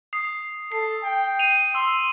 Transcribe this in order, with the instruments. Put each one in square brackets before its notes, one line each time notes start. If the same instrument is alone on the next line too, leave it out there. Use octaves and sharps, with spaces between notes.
[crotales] D#6 C7
[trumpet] A4 [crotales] C7
[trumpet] G5
[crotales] C7 D#7 F7
[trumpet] C6 [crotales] E6